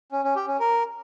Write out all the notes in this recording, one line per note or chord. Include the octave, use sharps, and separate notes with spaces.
C#4
C#4
G4
C#4
A#4